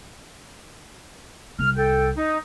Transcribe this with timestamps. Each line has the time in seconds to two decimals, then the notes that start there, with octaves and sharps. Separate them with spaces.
1.59 C2 F6
1.76 A4 G5
2.16 D#4